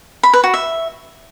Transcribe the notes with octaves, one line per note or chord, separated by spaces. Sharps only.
B5
B4
F#4
E5